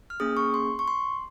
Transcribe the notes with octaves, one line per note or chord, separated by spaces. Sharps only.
F6
A#3 C#4 G#4 D#6
C#6
C6
C#6
C6